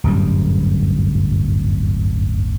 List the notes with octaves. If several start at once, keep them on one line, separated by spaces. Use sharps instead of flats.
D1 G1 F#2 G3